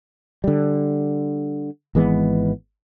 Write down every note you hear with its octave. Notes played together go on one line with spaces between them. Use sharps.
D3 G3
G#1 E3 G#3 B3